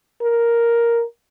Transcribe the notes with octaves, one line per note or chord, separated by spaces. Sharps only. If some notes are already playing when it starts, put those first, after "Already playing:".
A#4